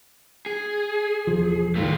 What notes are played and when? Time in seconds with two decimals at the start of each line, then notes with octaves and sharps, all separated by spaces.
0.46 G#4
1.27 E1 F3
1.76 D1 G2 D#3 A3 F4